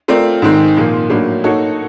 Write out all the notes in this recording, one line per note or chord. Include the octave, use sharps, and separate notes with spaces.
A3 C4 F4 A#4 D5
G#2 D#3 G#3 C4
A#2 F3 A#3
A2 F#3 A#3 D4
A#3 D#4 F#4 A4 C#5